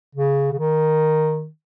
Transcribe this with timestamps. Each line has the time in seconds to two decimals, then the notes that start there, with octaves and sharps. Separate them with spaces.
0.15 C#3
0.52 C#3
0.58 D#3